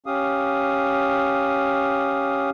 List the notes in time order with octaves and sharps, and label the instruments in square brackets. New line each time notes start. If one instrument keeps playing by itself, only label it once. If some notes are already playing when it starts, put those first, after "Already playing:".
[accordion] C#4 G4 F5 D#6